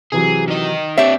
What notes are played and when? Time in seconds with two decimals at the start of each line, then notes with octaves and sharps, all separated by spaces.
0.12 C3 E3 F#3 G#4
0.48 D#3 D#5
0.98 C4 D4 G4 C#5 E5